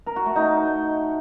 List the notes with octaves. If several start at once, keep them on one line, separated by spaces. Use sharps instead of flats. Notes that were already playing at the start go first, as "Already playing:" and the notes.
A#4
F#4
A3
D#4